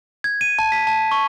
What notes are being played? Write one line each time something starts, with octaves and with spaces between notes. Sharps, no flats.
G#6
D#7
A5
B6
A5
C#6